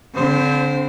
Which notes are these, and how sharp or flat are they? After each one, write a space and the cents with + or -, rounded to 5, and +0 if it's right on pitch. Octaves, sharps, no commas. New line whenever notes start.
D3 -40 C4 -20 C5 +0